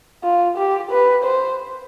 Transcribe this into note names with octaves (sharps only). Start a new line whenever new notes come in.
F4
G4
B4
C5